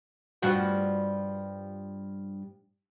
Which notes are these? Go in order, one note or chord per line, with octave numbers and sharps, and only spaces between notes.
G2 F3 F#4